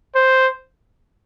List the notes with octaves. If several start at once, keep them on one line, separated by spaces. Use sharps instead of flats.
C5